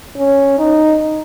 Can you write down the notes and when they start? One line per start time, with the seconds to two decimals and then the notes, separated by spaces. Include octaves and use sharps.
0.17 C#4
0.59 D#4